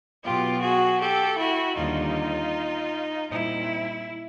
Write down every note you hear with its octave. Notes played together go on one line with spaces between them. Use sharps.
B2 F#3 B3 F4 G4
F#4 G#4
G4 A4
E4 F#4
D#2 D3 G3 D#4 F4
A#2 G3 C4 D#4 E4